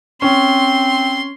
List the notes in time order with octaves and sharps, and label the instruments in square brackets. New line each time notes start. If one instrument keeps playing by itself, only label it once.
[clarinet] C4 [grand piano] C#4 [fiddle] C6